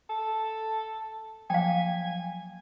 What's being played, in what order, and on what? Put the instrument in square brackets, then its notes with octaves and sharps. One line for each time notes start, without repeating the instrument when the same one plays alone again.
[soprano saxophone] A4
[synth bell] F3 F#3 A#3 [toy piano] F5 G5 [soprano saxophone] G#5